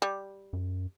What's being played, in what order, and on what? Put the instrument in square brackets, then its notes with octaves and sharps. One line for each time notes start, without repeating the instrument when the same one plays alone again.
[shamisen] G3
[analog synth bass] F#2